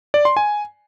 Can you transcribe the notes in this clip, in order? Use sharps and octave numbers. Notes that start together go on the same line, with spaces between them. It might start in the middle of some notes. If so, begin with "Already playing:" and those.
D5
C6
G#5